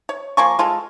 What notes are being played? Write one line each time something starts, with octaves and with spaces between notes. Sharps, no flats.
C#5
F3 A#3 G#5 C#6
G#3 F4 A4